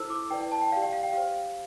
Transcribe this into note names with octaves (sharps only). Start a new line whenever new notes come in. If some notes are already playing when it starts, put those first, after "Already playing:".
Already playing: E4 A4 C5 E6
D6
E4 B4 D5 G5
G5
A5
G5
G4 D5 F5
G5
F5
G5
G4 C5 F5